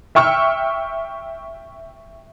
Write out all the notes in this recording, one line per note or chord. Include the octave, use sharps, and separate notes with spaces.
E5 G5 C#6 E6 F6